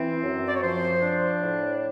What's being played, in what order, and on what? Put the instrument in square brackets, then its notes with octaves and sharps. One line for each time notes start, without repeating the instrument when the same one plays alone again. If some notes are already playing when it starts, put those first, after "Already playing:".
Already playing: [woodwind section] E3 C4
F#2
D5
C#5
F3 C5
D4
A2